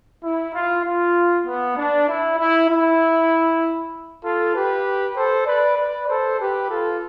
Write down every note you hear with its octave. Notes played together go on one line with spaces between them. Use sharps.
E4
F4
F4
B3
D4
E4
E4
E4
F4 A4
G4 B4
A4 C5
B4 D5
B4 D5
A4 C5
G4 B4
F4 A4